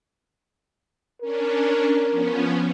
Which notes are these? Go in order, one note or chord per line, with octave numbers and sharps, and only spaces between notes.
C#4 D4 A#4
F3 B3 C#4